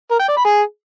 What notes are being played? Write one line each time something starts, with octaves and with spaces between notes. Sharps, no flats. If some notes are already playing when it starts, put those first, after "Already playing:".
A#4
G5
D5
B5
G#4